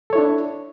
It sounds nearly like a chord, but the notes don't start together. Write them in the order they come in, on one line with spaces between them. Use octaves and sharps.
A4 C#5 E4 D4